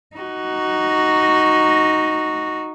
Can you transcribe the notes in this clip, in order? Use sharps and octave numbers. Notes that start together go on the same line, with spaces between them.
D#4 F#4